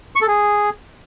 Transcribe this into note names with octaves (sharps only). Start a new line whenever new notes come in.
C#6
A4
G#4